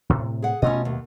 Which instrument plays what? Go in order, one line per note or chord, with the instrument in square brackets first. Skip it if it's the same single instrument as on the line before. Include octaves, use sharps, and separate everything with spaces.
[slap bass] A2 C3
[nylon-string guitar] G#4 F#5
[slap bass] B2 A3 B3 [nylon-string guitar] C#4 F4 D#5
[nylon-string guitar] D#2